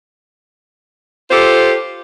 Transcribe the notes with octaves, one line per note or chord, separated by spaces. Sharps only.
F4 G4 A4 C5